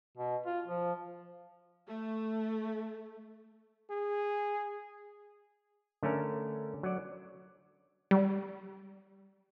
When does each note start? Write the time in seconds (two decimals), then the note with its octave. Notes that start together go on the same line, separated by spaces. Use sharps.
0.17 B2
0.46 F4
0.67 F3
1.87 A3
3.90 G#4
6.03 D3 A3 C#4 A#4
6.83 F#3 D5
8.11 G3